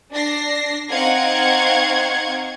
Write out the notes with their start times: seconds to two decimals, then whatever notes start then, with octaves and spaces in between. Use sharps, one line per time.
0.13 D4 A#6 C7
0.91 C4 D#4 F5 F#5 C#6 G#6